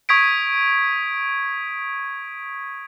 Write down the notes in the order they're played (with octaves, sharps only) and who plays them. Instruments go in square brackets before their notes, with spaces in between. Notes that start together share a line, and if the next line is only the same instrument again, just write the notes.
[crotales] C#6 D#6 G#6 B6 D7